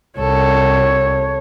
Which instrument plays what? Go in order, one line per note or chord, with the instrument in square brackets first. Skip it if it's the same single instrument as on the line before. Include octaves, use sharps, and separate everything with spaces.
[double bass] C2 [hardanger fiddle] A4 [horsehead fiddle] C#5